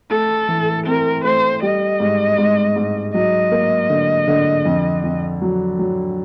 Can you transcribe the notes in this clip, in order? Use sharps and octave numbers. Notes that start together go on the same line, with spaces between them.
A3 A4
E3
C4 A#4
A3 C5
G3 D#5
G#2
G#2
G#2
F#3 D#5
A#3
D3
D3
F2
F2
F#3
F#3